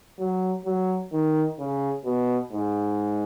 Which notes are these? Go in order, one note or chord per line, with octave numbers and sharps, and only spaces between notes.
F#3
F#3
D#3
C#3
B2
G#2